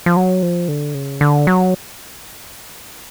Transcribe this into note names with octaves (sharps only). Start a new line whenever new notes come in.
F3
F#3
F3
D3
C#3
D3
F#3